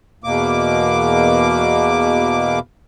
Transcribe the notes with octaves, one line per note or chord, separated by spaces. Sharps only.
E2 B2 A#3 D6